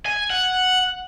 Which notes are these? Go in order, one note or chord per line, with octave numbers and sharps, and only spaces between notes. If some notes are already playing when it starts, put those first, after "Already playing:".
G#5
F#5